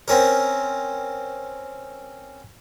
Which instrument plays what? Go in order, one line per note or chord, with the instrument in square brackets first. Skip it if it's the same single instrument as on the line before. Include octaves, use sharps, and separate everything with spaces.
[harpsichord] C4 C#4 A#4